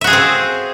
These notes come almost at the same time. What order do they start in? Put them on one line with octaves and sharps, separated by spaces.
E5 F#4 G#4 F5 C4